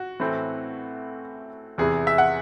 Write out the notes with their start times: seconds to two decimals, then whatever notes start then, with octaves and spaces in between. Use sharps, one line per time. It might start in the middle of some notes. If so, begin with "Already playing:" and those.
Already playing: F#4
0.20 A2 E3 A3 C4
1.78 E2 C3 E3 G#4
2.07 E5
2.18 F#5